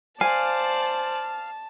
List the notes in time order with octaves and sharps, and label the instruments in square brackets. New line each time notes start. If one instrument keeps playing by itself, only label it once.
[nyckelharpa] C5 D5 [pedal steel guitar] F5 [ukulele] G#5 [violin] A5